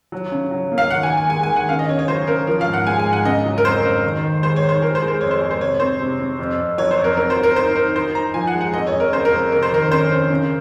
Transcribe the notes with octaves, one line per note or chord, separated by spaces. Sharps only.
F#3
C#3
F#3
A#3
F5
D#3 F#5
G#5
D#3
G#5
G#3 G#5
G#5
D#3
F#5
C#3 F5
D#5
C#3 C#5
C#5
F#3 C5
C#3 A#4
F3 A#4
F5
G#2
F#5
G#3 G#5
G#5
G#2
F#5
C#3 D#5
F#3
A#4
F2 C5
C#3
D#3
D#3
G#3 C5
C#5
D#3
C5
G#3 A#4
C5
G#3
C5
F2 C#5
C5
G#3
C5
C3 C#5
C4 C5
C3
C4
F2
F2
F#3 C#5
C5
F2
A#4
C4 A#4
C5
F#3
A#4
D#4 C5
D#4 A#4
D#4 C5
D#4 A#5
F3 G#5
F#5
G#3
F#5
F2 D#5
C#5
F2
A#4
C#3 C5
A#4
F2
C3 A#4
C5
D#3 A#4
C#4 C5
C#4
C#3